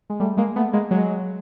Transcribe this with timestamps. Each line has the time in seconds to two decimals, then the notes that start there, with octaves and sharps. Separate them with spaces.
0.10 G#3
0.20 G3 A3
0.37 G#3 A#3
0.56 A3 B3
0.73 G#3 A#3
0.91 F#3 G#3